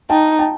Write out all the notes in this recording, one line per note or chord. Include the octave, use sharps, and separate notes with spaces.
D#4 G5 A5
G5 A5